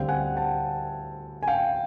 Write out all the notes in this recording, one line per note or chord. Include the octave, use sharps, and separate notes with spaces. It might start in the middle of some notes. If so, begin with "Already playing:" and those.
Already playing: D2 D3 G3 C4 F5 G5
F#5 G#5
G5 A5
G#5
F5 G5